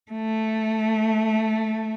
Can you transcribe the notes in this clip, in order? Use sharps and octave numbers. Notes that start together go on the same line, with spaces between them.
A3